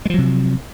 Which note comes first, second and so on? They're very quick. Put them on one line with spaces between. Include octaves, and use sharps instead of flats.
G#3 F3 F#3 C3